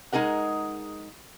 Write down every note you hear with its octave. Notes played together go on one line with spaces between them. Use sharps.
G#3 D#4 G#4 A#4 F#5